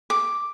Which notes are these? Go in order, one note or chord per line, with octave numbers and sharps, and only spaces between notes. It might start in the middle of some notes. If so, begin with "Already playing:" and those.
D6